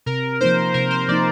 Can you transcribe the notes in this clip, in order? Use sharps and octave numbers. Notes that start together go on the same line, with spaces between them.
C3 A#4
F3 A#3 D#4 C5
C3 A#4
C5
F3 A#3 D#4 D5